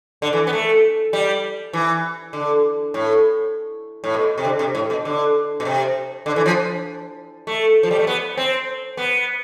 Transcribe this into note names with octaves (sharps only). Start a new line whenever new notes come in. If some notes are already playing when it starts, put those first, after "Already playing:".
D3
E3
B3
A3
G3
E3
D3
A2
A2
B2
C3
D3
C3
A2
B2
D3
B2
C3
D3
E3
F3
A3
F3
G3
A3
B3
C4
B3